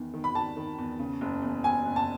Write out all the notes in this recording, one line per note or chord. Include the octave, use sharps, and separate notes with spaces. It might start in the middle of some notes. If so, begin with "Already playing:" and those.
Already playing: E2 D#3
D#3
B5
D#3 A5
D#3
E2
C#3
F#1
E2
F#1 G#5
F#1
A5